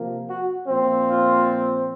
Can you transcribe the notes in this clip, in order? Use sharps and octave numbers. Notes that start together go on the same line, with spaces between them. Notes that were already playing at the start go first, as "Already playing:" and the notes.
Already playing: C3 F3 A#3
F#4
A#2 F3 C4
F4